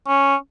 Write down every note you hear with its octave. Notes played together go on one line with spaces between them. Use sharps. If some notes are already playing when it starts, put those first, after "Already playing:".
C#4